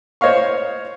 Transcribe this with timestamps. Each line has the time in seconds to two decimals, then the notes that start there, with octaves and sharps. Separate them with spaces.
0.21 C5 C#5 D#5 F5 C#6